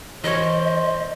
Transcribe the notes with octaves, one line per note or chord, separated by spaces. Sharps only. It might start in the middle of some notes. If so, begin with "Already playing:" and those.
E3 A#4 C5 C#5 D#5